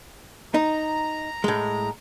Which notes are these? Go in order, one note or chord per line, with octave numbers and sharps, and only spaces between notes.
D#4 A#5
A2 G#3